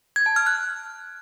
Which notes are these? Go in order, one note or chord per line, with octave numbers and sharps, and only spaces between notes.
G#6
A5
F6
F#6